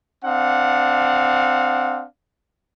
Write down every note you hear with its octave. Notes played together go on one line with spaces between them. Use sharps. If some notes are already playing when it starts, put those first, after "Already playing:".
C4 D4 F5 F#5